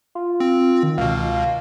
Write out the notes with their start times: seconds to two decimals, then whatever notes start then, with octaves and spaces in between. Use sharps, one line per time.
0.15 F4
0.40 C4
0.83 D#3
0.98 C#2 B2 F5